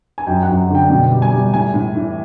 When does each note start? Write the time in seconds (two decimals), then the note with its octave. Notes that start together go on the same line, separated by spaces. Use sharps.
0.18 G#5
0.27 F#2 G5
0.43 F#5
0.48 F#2
0.69 D3
0.75 G5
0.90 B2 G5
1.11 G3
1.22 G#5
1.32 G3
1.53 A2 G#5
1.74 A2
1.95 E3